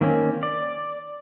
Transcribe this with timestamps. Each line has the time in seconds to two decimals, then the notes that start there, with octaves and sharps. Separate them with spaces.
0.01 D#3 A#3 C4 C#4
0.43 D5